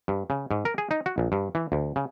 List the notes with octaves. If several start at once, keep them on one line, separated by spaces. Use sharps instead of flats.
G2
C#3
G#2
A#4
G#4
D#4
F#4
A#1
G2
E3
D2
C#3